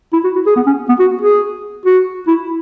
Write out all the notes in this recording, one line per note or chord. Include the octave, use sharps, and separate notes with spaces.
E4
F#4
F#4
G#4
B3
C#4
B3
F#4
G#4
F#4
E4